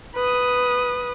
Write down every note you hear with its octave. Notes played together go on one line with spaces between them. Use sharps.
B4 D#6